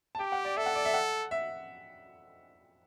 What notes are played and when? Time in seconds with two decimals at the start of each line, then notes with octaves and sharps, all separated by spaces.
0.15 A5
0.19 G4 G5
0.32 F#5
0.45 D5
0.56 A4 E5
0.66 F#5
0.75 D5
0.85 E5
0.94 F#5
1.31 E5